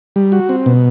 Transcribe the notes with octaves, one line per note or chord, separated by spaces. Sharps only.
G3
F#4
C4
B2